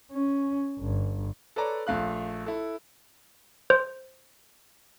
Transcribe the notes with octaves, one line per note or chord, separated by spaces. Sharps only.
C#4
G1
A4 B4 C#5 D5 A#5
A#1 A3 F5 F#6
E4 A4
C5